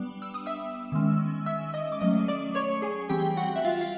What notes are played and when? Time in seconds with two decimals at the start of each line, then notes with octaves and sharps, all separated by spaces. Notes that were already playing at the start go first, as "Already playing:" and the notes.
Already playing: G3 B3 D4
0.22 E6
0.34 D#6
0.46 E5 E6
0.92 D#3 G#3 C#4
1.46 E5 E6
1.74 D#5 D#6
1.92 D6
2.01 F#3 A3 C#4 D#5 D#6
2.28 D5 D6
2.55 C#5 C#6
2.82 G#4 G#5
3.09 E3 G3 C4 G4 G5
3.37 F#4 F#5
3.56 E5
3.65 F4 F5
3.81 F5